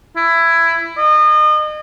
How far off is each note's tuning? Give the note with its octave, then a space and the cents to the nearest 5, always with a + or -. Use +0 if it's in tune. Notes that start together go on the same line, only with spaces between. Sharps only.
E4 +15
D#5 -35